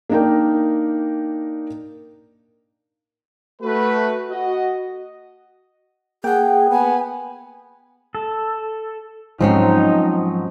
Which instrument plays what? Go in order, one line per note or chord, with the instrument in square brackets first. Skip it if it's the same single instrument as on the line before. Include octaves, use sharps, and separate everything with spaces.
[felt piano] A#3 D4 D#4 A#4 G5
[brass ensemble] A3 F#4 B4
F#4 D#5
[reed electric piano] A#3 F#5 [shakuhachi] G#4 [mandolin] G5
[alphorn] B3 [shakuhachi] G#5
[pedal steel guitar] A4
[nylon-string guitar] G#2 C4 C#4 [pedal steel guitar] F3 F#3 [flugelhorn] D#4